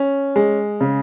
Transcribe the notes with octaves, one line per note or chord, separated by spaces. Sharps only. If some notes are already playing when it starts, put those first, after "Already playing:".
Already playing: C#4
G#3
C#3